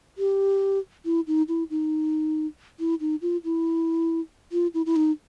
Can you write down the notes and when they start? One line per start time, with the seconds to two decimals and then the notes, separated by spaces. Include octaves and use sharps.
0.18 G4
1.05 E4
1.27 D#4
1.48 E4
1.70 D#4
2.79 E4
3.00 D#4
3.22 F4
3.44 E4
4.52 F4
4.74 E4
4.86 E4
4.96 D#4